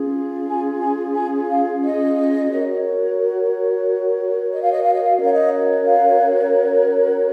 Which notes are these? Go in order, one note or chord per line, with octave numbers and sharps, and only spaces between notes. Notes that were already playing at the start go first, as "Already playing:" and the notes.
Already playing: C#4 F4 G#4
G#5
G#5
G#5
F5
D#5
F#4 A#4 C#5
D#5
F5
D#5
F5
D#5
F5
D#5
C#4 F#4 A#4 C#5 F5
D#5
F5